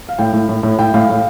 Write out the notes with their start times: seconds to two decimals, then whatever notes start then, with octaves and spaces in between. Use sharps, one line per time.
0.09 F5
0.19 A2 G5
0.33 A2
0.49 A2
0.63 A2
0.79 A2 G5
0.94 A2 F5
1.09 A2